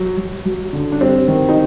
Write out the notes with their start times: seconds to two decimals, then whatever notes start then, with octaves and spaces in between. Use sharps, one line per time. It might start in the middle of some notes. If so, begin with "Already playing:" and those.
Already playing: F#3
0.17 F#3
0.45 F#3
0.73 D3
0.92 D4
1.01 G2 C4
1.28 D#3
1.49 D#4